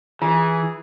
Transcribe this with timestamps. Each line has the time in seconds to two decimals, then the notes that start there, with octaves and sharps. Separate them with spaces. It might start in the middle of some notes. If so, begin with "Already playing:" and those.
0.22 E3 F4 G#4